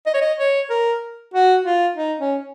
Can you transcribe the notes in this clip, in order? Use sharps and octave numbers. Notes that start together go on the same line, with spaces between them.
D#5
C#5
D#5
C#5
A#4
F#4
F4
D#4
C#4